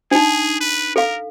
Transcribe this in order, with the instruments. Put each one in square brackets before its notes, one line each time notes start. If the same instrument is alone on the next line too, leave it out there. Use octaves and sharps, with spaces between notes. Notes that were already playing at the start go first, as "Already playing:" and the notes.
[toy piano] D4 D#4 [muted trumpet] G#4
[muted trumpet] B4
[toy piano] A4 F5 [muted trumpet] A#4